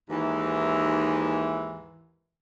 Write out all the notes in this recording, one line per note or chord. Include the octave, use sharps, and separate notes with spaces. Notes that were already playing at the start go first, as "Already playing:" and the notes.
D#2 G#2 E3